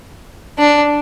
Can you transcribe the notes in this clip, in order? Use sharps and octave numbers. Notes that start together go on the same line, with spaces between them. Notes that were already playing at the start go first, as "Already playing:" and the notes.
D4